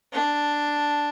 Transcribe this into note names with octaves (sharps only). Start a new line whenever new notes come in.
D4